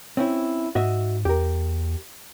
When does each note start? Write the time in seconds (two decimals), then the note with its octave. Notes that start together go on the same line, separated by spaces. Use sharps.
0.17 C4 C#4 E4
0.75 G#2 F#4 D#5 E5
1.25 E2 G4 A#4